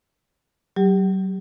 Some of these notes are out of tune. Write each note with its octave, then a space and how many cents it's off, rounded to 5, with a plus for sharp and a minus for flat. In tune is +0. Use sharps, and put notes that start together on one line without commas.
F#3 +40 G4 +20